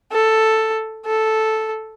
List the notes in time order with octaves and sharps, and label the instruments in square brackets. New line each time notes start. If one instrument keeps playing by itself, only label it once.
[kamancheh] A4
A4